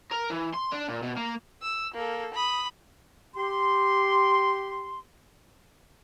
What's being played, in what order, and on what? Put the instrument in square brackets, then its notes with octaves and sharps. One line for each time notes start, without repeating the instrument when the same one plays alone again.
[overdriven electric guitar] A#4
E3
C6
D4
A#2
B2
A#3
[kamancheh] E6
A#3 A4
B5 D#6
[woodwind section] G4 C6